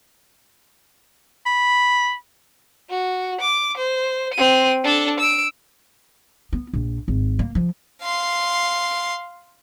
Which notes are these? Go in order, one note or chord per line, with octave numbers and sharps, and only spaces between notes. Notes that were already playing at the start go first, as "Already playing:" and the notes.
B5
F#4
D6
C5
C4 D#7
D4 A4
E6 D7
B3
A#1
G#1
A#3
F3
F5 C6